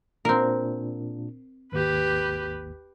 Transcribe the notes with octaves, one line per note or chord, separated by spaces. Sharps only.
A#2 C4 D4 A#4
G#1 D#2 G4 B4